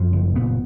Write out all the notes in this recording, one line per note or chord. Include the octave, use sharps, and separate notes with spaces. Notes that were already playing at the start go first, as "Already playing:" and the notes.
Already playing: F#2 F3
F#1
A#2 B3